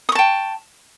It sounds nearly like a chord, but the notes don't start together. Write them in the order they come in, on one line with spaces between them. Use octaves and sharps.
D#6 C#6 A5 G5